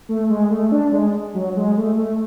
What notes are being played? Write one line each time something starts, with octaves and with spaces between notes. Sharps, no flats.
A3
G#3
A3
D4
G#3
F#3
G#3
A3
A3